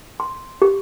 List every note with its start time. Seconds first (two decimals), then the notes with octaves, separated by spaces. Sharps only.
0.20 C6
0.62 G4